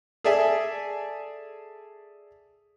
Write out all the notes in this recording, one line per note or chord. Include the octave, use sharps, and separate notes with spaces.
G#4 A4 D5 E5 G#5